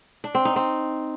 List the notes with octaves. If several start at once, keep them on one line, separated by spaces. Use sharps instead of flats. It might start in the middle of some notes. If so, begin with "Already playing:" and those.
D4
C4
D#4
C4